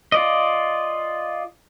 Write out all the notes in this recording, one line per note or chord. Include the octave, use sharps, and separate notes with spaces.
F4 D5 D#5